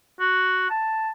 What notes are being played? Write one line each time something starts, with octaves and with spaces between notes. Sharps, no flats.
F#4
A5